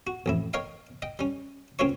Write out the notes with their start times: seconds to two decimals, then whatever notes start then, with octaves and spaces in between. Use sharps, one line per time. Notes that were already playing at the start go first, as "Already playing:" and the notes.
0.07 F#4
0.26 A1 F2 E4
0.53 A#4 C#5 D#5 F5 G5
1.02 D#5 G5
1.19 G3 C#4
1.79 C#2 C4 C#4 F4 C#5 C#6